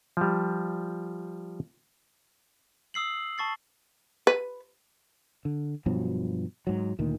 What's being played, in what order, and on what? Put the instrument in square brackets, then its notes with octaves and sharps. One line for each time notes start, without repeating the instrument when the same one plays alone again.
[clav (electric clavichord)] F3 G3
[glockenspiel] D#6 E6 C7 F#7
A5 C#6 A6 C7
[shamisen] B4
[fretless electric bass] D3
G2 B2 F3 F#3
G#2 F#3
D2 A#2 D#3